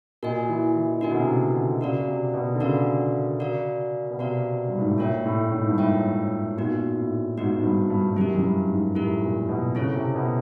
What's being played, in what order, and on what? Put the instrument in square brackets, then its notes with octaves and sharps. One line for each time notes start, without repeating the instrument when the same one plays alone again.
[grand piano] A#2 [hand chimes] F#4 A#4 D#5 G#5
[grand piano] E3
E3
[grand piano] D3 [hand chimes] F#4 A#4 D#5 G#5
[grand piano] B2
C3
C#3
D3
[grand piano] C#3 [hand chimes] F#4 A#4 D5 F5
[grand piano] C3
B2
D3
[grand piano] C#3 [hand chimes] F#4 A#4 D5 F5
[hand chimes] F#4 A#4 D5 F5
[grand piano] B2
[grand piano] C3 [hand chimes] F#4 A#4 D5 F5
[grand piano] G2
G#2
A2
[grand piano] A#2 [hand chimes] F4 A#4 C#5 E5 G5
[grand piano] A2
A2
G#2
G2
[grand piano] G#2 [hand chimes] F4 A#4 C#5 E5 G5
[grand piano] A#2 [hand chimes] B3 D#4 F#4
[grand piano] A2
[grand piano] G#2 [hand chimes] B3 D#4 F#4
[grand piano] G#2
G2
G2
G2
[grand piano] F#2 [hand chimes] E4 G4 A#4
[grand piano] F#2
G2
G#2
[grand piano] A2 [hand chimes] E4 G4 A#4
[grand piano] A#2
B2
[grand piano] C#3 [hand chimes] C4 E4 A4 C#5
[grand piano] C3
B2